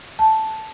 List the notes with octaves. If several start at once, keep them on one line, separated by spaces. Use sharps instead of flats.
A5